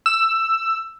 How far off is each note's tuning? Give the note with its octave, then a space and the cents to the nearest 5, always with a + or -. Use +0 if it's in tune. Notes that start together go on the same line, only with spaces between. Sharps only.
E6 +10